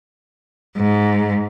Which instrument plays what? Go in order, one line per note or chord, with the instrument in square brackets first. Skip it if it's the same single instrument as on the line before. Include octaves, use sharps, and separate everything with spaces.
[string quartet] G#2